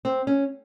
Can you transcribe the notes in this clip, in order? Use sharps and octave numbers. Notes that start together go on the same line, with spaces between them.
C4
C#4